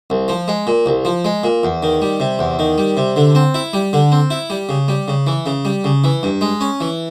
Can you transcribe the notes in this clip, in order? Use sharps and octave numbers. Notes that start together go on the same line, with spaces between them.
C2
F3
G#3
A#2
C2
F3
G#3
A#2
E2
D#3
G3
C3
E2
D#3
G3
C3
D3
C4
E4
G3
D3
C4
E4
G3
C#3
G3
C#3
E3
C#3
G3
C#3
E3
G2
G#3
C#4
E3